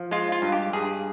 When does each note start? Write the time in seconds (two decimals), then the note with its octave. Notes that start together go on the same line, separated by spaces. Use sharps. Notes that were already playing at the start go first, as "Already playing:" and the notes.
Already playing: F3
0.11 G#3 F4
0.32 F4
0.42 G2
0.52 G4
0.73 G2 G#4